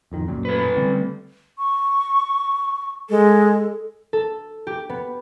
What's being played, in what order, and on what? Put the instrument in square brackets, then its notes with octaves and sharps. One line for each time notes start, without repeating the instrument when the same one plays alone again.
[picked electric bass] D1 F2 D#3
F#2 A#2
[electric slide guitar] A3 B4
[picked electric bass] D3 G3 C4
[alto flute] C#6
[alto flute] G#3 [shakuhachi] A4
[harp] A4
G4
B3